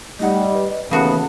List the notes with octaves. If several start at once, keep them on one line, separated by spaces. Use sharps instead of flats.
G3 A3 D#4 D#5 F#5
B4
D#2 C#3 E3 A3 B3 F#4 A5